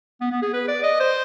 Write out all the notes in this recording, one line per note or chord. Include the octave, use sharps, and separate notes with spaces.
B3
B3
G#4
B4
D5
D#5
C5